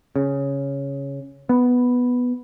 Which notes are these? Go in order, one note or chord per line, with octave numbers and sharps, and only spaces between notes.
C#3
B3